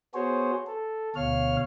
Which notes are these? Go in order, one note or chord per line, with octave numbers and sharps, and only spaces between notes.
B3 F#4 G#4 C5 C#5
A4
D2 B2 C#5 F5 F6